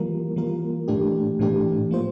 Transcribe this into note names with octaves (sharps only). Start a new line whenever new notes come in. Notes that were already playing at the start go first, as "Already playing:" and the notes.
Already playing: E3 G3 A#3 F4 A#4
E3 G3 A#3 F4 A#4
A2 E3 A3 D4 G4
A2 E3 A3 D4 G4
F3 A#3 F4 C5